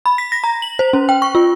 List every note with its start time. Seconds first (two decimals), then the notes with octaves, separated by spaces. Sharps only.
0.06 B5
0.18 B6
0.32 A#6
0.44 A#5
0.62 F#7
0.79 C5
0.93 C#4
1.09 G5
1.22 C#6
1.35 F4